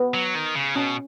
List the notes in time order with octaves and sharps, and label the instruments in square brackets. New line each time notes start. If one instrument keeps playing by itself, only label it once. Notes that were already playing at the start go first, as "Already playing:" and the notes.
Already playing: [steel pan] B3
[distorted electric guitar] F#3
D#3
C#3
[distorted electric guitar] B2 [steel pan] C#4